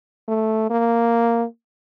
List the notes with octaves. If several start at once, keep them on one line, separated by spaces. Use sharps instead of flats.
A3
A#3